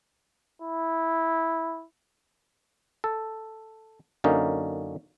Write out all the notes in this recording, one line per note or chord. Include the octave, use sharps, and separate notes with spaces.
E4
A4
F#2 D3 A#3 C#4 D#4